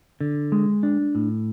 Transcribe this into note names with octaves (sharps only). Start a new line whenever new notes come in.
D3
G#3
D4
A2